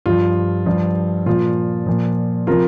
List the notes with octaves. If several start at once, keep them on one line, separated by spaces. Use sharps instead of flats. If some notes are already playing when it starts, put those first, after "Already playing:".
G2 F3 F4
G2 F3
A#2 F3 F4
A#2 F3
C3 F3 F4 A#4